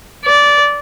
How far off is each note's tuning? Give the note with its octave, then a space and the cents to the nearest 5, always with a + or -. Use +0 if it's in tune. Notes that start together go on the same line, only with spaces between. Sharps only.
D5 -15